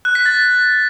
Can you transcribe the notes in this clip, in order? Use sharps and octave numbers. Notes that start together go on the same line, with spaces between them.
F#6
B6
A6